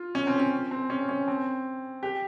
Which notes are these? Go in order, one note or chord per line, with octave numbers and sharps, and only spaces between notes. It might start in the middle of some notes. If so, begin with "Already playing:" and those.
Already playing: F4
C#4
C4
C#4
C4
C#4
C#4
C4
G4